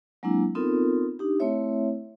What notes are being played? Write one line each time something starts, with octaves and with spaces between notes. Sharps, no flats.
F#3 G#3 A#3 C4 D4 E4
B3 C4 D#4 F4 A4 A#4
D4 D#4 G4
A3 C4 E4 C#5 E5